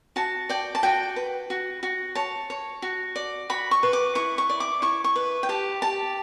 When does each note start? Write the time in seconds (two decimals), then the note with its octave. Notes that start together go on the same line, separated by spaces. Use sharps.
0.16 F#4 A5
0.49 D5 G5
0.75 A5
0.83 F#4 G5
1.16 B4
1.50 F#4
1.83 F#4
2.15 C#5 A5
2.50 C#5
2.82 F#4
3.16 D5
3.50 F#4 B5
3.71 C#6
3.83 B4
3.93 D6
4.15 E4 C#6
4.38 C#6
4.50 D5
4.60 D6
4.82 E4 C#6
5.04 C#6
5.16 B4
5.43 G5
5.49 G4 A5
5.82 G4 A5